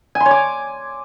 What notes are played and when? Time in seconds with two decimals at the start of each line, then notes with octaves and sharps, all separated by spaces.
0.15 G#5
0.20 C6
0.26 C#5
0.31 D6